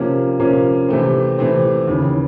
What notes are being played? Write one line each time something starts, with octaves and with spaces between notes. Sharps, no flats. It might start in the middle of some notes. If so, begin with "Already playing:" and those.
Already playing: C3 F3 A#3 C#4
C3 F3 A#3 C#4
C3 E3 A3 C4
C3 E3 A3 C4
D#2 C#3 E3